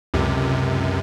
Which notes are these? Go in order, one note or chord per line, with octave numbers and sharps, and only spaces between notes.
C#2 F#2 C3